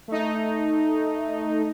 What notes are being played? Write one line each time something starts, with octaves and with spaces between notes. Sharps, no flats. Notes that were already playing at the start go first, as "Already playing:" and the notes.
A3 D#4